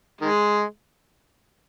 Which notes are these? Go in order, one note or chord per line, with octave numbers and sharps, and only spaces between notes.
D#3 G#3